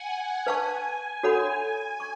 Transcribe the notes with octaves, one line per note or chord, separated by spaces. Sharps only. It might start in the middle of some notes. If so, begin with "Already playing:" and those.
Already playing: F#5 G#5
B4 F5 G#5 A5 C#6
F#4 A4 C#5 F#5 G#5 B5
C#6